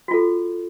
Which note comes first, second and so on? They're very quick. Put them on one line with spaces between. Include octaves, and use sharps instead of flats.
F#4 F4 A4